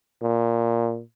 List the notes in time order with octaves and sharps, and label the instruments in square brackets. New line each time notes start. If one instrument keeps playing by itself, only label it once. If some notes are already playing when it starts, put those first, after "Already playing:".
[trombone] A#2